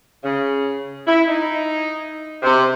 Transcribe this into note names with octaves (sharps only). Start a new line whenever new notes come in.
C#3
E4
D#4
C3